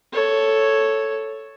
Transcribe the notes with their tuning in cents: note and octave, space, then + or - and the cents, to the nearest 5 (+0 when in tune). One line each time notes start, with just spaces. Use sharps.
A4 +0 C#5 +0